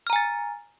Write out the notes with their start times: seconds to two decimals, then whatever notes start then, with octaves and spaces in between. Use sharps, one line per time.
0.07 F6
0.10 A#5
0.13 G#5
0.16 A6